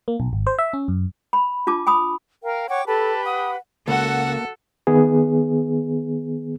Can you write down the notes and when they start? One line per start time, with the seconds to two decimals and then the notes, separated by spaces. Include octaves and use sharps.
0.08 A#3
0.20 B1
0.33 G#1
0.47 C5
0.59 E5
0.73 C#4
0.88 F#2
1.33 B5
1.67 D4 F4 A5 D6
1.87 G#5 B5 D#6
2.43 A#4 F5 G5
2.69 C#5 F#5 G5 D6
2.87 G4 A4 B4 A5 B5
3.26 F#5 D#6
3.88 C#2 A#3 F#4 A4 F#5
4.87 D#3 B3 G#4